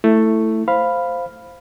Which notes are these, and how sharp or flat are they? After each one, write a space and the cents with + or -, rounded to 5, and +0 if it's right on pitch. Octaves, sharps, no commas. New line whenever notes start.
A3 +10 E4 +0
C5 +0 F5 +0 B5 +0